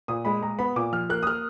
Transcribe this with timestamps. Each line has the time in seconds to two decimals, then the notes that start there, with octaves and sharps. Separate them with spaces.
0.08 A#2 D#6
0.25 G#3 B5
0.42 G#3 A#5
0.59 B3 B5
0.76 A#2 D6
0.93 F3 F6
1.10 A#3 F#6
1.23 D#6
1.27 A#3 F6